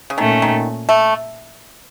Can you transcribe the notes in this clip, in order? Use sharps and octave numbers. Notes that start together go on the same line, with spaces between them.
C#3
A#2 D#3 A3 C#4
D#3
A3